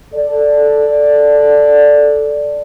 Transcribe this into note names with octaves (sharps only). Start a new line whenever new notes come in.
A4 D5